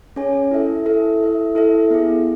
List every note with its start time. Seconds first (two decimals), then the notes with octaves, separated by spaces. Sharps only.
0.16 C#4 G#4 C#5 G#5
0.51 E4 A4 E5
0.86 E4 A4 E5
1.20 E4 A4 E5
1.55 E4 A4 E5
1.90 B3 E4 G#4